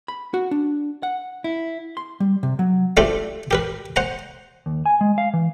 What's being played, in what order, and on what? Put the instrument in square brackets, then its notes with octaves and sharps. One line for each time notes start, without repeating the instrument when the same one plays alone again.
[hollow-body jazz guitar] B5
F#4
D4
F#5
E4
C6
G3
C3
F#3
[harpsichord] A3 C4 D4 F4 G4 A4
G4 A#4 B4
C5 F#5 A#5
[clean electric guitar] D#2
G#5
G#3
F5
E3